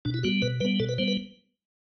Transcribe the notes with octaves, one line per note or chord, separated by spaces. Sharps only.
B2 D4
E4
G3 B3 F#4
B2 B4
G3 B3 B4
B2 A4
B4
G3 B3 C5
B4